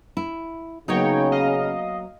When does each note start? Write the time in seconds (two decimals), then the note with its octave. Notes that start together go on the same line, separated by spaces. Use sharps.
0.17 E4
0.88 C#3 F#3 A#3 B3 D#4 C#5 G5
1.32 D#5 F5